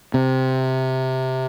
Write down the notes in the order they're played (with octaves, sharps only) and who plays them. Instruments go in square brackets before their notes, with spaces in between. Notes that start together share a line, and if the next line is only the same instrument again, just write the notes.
[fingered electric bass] C3